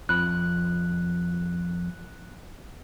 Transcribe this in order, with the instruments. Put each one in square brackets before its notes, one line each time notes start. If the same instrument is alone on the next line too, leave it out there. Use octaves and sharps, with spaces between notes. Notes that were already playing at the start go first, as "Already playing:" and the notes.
[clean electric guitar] F2 F3 B5 [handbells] F#6